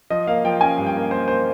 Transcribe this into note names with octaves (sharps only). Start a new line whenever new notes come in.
F3 D#5
A#3 F5
F3 G5
C#4 G#5
G2
G5
A#3
A#3 C5
A#3 C5